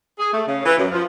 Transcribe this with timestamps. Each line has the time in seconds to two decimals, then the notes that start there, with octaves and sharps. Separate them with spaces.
0.19 G#4
0.33 A3
0.47 C#3
0.65 E3
0.77 F#2
0.91 F3